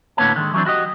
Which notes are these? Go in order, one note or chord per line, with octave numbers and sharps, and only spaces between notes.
A2 D3 A#3 B3 C#5 A5
D3 D#3 F3 G#3
E3 F#3 A3 C4 D4
E4 F#4 G4 D#5